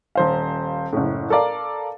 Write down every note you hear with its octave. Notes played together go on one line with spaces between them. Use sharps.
D#1 C5 F5
F#1 A2
A4 A#4 D5 F5